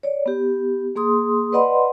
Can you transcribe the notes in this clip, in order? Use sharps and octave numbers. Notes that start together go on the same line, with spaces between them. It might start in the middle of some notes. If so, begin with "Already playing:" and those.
C#5 D5
B3 G4
A#3 G#4 C6 D#6
B4 D5 D#5 F#5 B5 C6